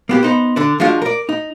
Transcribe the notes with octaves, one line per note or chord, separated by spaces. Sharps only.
A#3 B3 G4
B3 D#4 C5
D3 D4
F3 G#3 D4 F4 F#4
A#4 D5
D#4